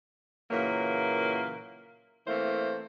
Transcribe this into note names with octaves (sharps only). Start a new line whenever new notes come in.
A#2 C#3 E3 F#3 A#3
E3 A3 A#3 C4 C5